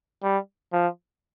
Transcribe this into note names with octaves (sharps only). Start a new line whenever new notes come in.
G3
F3